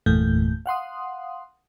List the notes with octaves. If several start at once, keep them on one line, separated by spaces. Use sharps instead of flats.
G1 E2 A#2 A3 G6
F5 F#5 C6 D#6